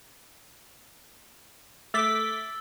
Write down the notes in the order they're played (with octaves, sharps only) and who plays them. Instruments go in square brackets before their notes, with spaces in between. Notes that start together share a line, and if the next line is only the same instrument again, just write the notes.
[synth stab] A3 D6 B6 [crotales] E6 A6 G7